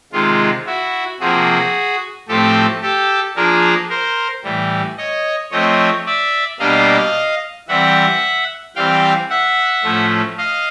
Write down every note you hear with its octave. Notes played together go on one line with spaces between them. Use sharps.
C3 D#3 G#3 F4
E4 F#4
C3 F3 A#3 F#4 G#4
A2 F3 A3 C4 G4 A4
G4 A4
F3 A#3 D4 G#4 A#4
A#4 C5
A2 E3 G3
C#5 D#5
F3 A3 C4 C#5 D#5
D5 E5
B2 G3 A#3 D4 D#5 F5
E3 G3 C4 E5 F#5
E3 G3 C4 F5 G5
E5 F#5
A2 F3 A3 C#4
D#5 F5